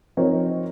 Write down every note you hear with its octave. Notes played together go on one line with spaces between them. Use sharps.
F3 C4 D#4 A#4 C#5